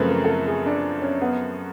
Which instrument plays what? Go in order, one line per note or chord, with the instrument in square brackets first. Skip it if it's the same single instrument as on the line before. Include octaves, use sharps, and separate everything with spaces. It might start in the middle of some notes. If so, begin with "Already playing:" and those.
Already playing: [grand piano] F#2 C#3 F3 A3 C4 [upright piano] A#4 B4
[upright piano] A#4
A4
A#4
G#4
D4
C#4
B3